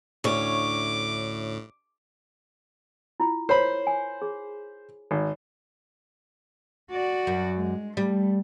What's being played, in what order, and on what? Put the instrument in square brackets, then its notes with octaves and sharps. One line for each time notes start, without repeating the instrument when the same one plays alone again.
[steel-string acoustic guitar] D2 C#4 C#5 [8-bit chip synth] A2 [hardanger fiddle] D6
[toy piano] E4 F4
[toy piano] A#4 C#5 [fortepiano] C5 B5
[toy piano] G#5
G#4
[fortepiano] G#1
[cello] F#4 D5
[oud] F#2
[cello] G#3
[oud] G3 [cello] A3